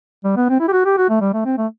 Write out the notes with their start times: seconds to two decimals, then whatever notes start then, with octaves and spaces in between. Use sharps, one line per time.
0.24 G3
0.36 B3
0.49 C4
0.60 E4
0.68 G4
0.72 F#4
0.85 G4
0.98 F#4
1.09 A3
1.21 G3
1.33 A3
1.45 C4
1.58 A3